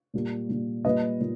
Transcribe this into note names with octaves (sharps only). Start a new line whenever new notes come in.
A#2 G3 A#3
A#2 G3 A#3
A#2 G3 A#3 B4 D#5
A#2